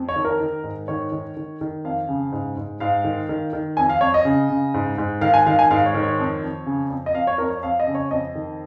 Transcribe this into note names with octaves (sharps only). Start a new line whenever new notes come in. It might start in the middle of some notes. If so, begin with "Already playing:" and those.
Already playing: F2
C#5
D#3
A#4
D#3
G#2
D#3 C#5
D#3
D#3
D#3
F2 F5
C#3
G#2
G#2
G#2 F5
D#3
D#3
D#3
F2 G#5
F5
F2 C#5
D#5
C#3
C#3
G#2
G#2
D#3 F5
G#5
D#3 F5
G#5
G#2 F5
C#5
D#3
C#5
F2
F2
C#3
F2
D#5
F2 F5
C#5
F2 A#4
C#5
F2 F5
D#5
C#3
C#5
F2 D#5
D#3